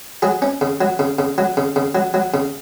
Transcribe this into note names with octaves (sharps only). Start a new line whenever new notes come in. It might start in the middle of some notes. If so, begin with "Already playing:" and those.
F#3 G#4
C#4
C#3
F#3
C#3
C#3
F#3
C#3
C#3
F#3
F#3
C#3